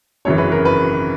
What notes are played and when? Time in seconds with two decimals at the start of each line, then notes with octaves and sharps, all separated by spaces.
0.25 G#1 F#2 C#3 E3 C#5
0.38 B4
0.52 A#4
0.65 B4